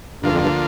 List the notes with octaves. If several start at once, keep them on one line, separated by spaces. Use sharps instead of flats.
D2 G2 D3 F3 A#3 F4
F2
G2